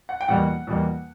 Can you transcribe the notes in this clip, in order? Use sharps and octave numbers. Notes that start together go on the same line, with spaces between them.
F#5
G5
E2 B2 G3 A#3 F#5
E2 B2 G3 A#3